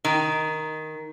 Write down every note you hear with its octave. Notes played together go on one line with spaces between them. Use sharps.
D#3